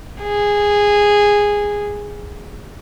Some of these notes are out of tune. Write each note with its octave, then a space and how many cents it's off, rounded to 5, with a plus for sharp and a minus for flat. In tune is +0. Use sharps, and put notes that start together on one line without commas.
G#4 -10